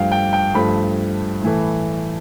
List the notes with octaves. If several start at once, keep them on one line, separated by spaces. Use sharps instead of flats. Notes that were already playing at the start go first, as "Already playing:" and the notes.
Already playing: G2 F3 A3 F5 G5
G5
G5
G2 F3 A3 B5
A2 E3 A3